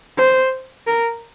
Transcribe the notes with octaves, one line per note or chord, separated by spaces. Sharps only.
C5
A#4